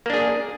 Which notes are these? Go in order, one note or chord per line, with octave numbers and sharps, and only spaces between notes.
A#3 D4 G#4